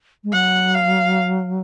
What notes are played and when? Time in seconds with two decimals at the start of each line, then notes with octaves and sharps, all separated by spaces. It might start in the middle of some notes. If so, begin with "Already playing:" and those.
0.24 G#3
0.33 F#3 F#5
0.74 F5